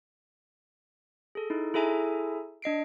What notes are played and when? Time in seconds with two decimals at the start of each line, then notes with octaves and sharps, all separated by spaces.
1.35 G#4 A4
1.50 D#4 E4
1.74 E4 G#4 A4 E5 G#5 A#5
2.62 D4 D#5 C7 D7